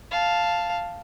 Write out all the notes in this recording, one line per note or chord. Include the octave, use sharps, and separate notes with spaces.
F5 A5